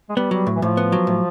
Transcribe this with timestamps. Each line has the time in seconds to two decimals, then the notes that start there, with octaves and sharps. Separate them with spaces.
0.10 G#3
0.16 G3 B3
0.31 F#3 G3
0.47 A2
0.56 E3
0.62 A2 F3
0.77 B3
0.92 F#3
1.07 A2